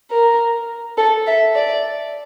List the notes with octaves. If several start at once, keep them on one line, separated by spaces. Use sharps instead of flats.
A#4
A4
E5
D5